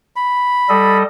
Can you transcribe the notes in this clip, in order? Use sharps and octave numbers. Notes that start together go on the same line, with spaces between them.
B5
G3 A4 D#5